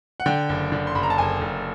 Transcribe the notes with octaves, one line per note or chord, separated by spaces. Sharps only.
F#5
D3 G5
F#1
D3
C6
F#1 B5
A#5
A5
F#1 G#5
F#1